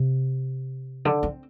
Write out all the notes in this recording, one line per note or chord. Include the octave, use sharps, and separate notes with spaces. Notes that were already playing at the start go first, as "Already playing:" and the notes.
Already playing: C3
D3
C4